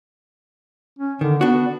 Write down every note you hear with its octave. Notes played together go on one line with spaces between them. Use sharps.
C#4
D3 D#3
B3 D4 F#4